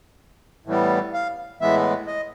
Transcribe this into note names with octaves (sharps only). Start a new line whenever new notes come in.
A2 E3 G3 B3
F5
A2 E3 G#3 B3 E5
D#5